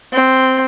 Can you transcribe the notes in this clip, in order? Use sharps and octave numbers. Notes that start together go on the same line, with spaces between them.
C4